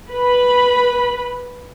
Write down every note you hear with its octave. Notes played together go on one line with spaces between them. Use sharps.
B4 B5